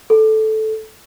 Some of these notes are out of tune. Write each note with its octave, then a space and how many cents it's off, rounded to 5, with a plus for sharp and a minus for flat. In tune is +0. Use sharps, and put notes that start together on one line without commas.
A4 -10